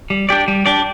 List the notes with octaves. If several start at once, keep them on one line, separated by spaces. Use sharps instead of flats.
G3
D4 G4 D5
G3
D4 G4 D5